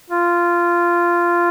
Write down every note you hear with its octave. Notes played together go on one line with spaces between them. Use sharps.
F4